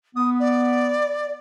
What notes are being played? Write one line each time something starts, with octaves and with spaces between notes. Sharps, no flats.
B3 D#6
D5